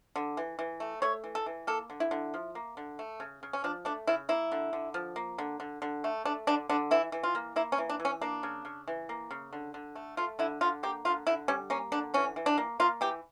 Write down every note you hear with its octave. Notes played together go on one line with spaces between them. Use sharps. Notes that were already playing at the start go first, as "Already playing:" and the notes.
D3
E3
E3
A3
A3 C#5
E3
A4
E3
A#3 A4
D3
E4
D3
F3
A#3
D3
A3
C#3
C#3
C#4
F3 D4
A3 D4
C#3 E4
A#3 E4
D3
D3
F3
A#3
D3
D3
D3
A3
A3 D4
D3 D4
D3 D4
E3 E4
E3
F4
A#3
A#3 E4
C#4
E3
D4
E3
C#4
A#3 D4
C#3
C#3
E3
A#3
C#3
D3
D3
A3
A3 F4
D3 E4
D3 F4
A#3 G4
D3 F4
D3 E4
G3 C#4
A#3 C#4
D3 D4
E3 C#4
E3
D4
A#3
A#3 F4
E3 G4